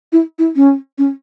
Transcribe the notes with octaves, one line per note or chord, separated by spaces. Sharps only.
E4
E4
C#4
C#4